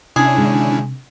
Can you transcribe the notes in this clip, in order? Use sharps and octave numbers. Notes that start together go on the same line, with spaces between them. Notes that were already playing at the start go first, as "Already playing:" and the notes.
C3 C#4 D4 E4 G#4
D3 D#3 G#3